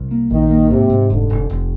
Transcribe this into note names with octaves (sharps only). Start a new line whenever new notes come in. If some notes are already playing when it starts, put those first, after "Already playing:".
Already playing: C2
A#3
A#1 D#3
A#3
G#2 C3
G#2
F1 D3
F1
F1